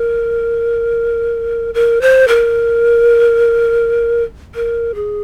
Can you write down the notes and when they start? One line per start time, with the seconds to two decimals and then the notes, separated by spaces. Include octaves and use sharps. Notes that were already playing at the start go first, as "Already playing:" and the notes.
Already playing: A#4
1.74 A#4
2.01 C5
2.28 A#4
4.55 A#4
4.95 G#4